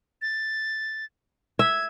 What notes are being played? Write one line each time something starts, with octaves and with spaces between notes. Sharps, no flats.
A6
E5 G#6